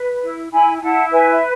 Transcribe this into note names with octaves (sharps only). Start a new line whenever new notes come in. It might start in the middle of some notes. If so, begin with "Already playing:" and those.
Already playing: B4
E4
E4 G#5 B5
G#5
E4 F#5 A5
B4 E5 G#5
E5